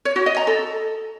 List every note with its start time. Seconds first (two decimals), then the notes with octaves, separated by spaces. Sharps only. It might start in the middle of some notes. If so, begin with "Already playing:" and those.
0.05 C#5
0.16 F#4
0.26 D#5
0.37 A#5
0.47 A4